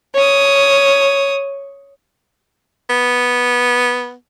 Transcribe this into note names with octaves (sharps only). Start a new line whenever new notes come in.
C#5 D#6
B3